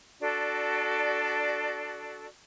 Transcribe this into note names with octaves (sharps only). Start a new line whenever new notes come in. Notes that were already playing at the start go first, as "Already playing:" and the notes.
D4 F#4 A4 D5